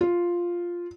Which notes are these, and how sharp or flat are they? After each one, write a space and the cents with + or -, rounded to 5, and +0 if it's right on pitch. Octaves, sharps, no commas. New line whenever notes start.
F4 +0